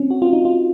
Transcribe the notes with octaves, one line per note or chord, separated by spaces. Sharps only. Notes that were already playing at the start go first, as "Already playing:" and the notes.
Already playing: C4 C#4
F#4
F4
D#4
F4